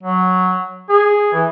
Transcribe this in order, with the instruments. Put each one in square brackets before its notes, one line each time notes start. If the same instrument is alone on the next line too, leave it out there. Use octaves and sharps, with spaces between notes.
[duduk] F#3
G#4
E3